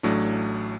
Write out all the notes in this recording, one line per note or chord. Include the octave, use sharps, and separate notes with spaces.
A1 A2 F#3 A3 D4